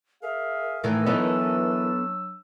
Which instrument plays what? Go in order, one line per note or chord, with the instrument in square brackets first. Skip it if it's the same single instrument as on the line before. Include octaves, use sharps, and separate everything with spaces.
[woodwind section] G#4 E5 F5 [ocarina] A#4
[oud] A2 D#3 E3
[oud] E3 D#4 [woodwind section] F#3 D4 E6 [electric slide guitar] B3 A4